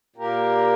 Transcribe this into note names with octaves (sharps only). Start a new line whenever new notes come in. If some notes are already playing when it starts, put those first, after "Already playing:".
A#2 A#3 G4 A#4